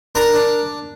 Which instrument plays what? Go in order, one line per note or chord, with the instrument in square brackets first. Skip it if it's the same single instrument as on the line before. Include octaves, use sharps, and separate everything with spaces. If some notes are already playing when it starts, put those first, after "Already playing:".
[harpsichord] D4 A#4 A#5
D4